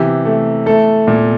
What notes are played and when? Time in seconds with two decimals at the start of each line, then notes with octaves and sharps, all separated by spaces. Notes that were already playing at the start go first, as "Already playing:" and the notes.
Already playing: C3 E3 G4
0.25 A3
0.66 A3 A4
1.07 A#2